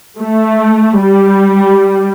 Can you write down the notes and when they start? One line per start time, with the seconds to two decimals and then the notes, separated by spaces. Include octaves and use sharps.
0.20 A3
1.00 G3